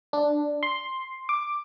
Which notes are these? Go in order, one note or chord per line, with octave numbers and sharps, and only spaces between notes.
D4
C6
D6